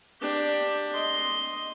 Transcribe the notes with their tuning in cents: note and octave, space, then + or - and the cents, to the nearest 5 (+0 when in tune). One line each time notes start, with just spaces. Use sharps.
D4 +10 G4 +5
D#5 +5 C6 +0